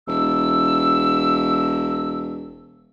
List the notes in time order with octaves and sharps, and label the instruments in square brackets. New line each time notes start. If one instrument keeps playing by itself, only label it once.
[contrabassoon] E1 [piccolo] E6